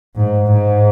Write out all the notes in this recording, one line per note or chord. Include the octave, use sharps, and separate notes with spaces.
G#2
G#2